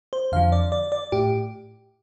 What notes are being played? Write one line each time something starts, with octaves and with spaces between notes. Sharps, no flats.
C5
F2 D3 F3 F5
D5
D5
D5
A2 G4